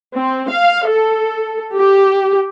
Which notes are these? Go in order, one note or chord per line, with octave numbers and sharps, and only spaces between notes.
C4
F5
A4
G4